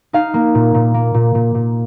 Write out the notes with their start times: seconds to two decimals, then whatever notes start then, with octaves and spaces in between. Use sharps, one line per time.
0.13 D#4 F5
0.34 A#3
0.55 A#2
0.74 A#2
0.94 A#3
1.14 A#2
1.35 A#2
1.55 A#2